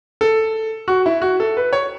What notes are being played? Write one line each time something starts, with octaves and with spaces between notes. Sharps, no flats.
A4
F#4
E4
F#4
A4
B4
C#5